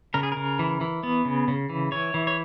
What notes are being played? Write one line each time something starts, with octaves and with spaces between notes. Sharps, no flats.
C#3 A#4
G#4
C#3 A#4
E3
E3
B3
C#3
C#3
E3
E3 C#5
E3
C#5